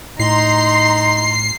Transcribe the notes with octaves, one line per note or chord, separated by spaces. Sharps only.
A2 D#4 A#5 C6 C7